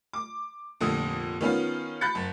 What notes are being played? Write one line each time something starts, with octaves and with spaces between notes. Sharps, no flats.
D6
F1 A#2 D3 D#6
D#3 B3 C#4 F4
B5 F#6 G6 A6 C#7
F#1